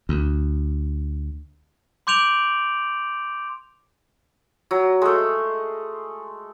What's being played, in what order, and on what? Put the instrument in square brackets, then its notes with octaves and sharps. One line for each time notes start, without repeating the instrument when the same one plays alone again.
[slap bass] D2
[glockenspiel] C6 D6 G6 D7 F7 F#7
[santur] F#3
G#3 A3